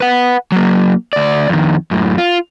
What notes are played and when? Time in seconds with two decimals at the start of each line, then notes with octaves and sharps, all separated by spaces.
0.01 B4 F#5
0.52 F#3 A#3
1.13 D2 D5
1.49 F2 D#3
1.91 F#2 A2
2.18 F4